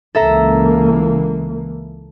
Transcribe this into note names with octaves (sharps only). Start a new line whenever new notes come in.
C#2 E3 A#3 A4 E5 A#5